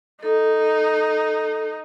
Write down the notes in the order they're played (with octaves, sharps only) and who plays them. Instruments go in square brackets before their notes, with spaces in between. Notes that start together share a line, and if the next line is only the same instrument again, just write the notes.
[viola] D#4 [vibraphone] A4